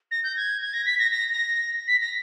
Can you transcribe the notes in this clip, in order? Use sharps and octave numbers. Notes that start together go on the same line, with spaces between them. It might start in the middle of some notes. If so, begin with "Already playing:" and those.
A#6
G6
G#6
G#6
A#6
B6
A#6
A#6
A#6
B6
A#6